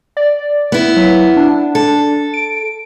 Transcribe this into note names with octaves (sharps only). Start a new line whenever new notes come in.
D5
B3 E4
F#3
D4
A4
D7